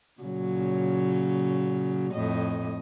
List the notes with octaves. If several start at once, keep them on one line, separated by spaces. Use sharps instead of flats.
A#2 C#3 F#3
F2 A2 D#5